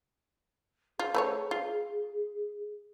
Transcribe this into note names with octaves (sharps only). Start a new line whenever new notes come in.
F4 G#4
A3 B4 C#5
F4